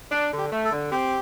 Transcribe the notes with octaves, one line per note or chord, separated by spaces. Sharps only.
D4
D3
G4
A3
A4
D3
C4 G4